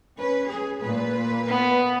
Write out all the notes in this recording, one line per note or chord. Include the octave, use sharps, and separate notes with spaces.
C#4 B4
G#4
A#2 B4
B3